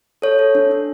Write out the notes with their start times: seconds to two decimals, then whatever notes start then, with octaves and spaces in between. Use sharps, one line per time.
0.22 A4 C#5
0.39 A4
0.55 D4
0.71 D4